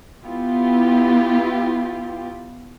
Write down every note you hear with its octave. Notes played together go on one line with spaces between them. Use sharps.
B3 E4 F4 G4